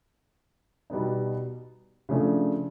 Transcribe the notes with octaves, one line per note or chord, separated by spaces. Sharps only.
B2 G3 B3 D#4
C#3 F3 A3 D4